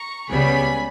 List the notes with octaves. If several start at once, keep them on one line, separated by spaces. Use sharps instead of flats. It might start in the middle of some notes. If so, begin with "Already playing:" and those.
Already playing: A#5 C#6
C#2 C#3 G3 B3 G#5 B5